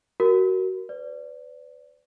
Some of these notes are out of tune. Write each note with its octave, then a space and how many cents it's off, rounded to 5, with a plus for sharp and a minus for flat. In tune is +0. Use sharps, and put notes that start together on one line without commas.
F#4 +20 A#4 +0
B4 +35 D5 -15